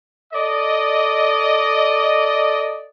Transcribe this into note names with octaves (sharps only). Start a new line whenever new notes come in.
A4 D5 D#5